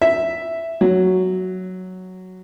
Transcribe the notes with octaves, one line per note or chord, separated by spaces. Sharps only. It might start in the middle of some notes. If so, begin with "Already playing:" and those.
E5
F#3